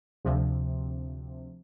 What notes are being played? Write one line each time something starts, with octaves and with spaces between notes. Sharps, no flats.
D2 C3 F3